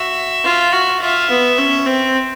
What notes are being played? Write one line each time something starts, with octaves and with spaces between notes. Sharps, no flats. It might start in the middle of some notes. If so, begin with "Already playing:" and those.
Already playing: F#4 E5
F4
F#4
F4 E5
B3
C#4
C4